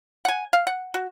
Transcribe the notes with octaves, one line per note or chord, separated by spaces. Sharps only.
F#5 G#5
F5
F#5
F#4